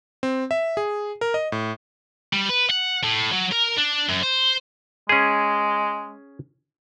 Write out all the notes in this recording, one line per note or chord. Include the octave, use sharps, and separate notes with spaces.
C4
E5
G#4
A#4
D#5
A2
G3
B4
F#5
A2
F#3
A#4
D4
F#2
C5
G#3 C#4 G#4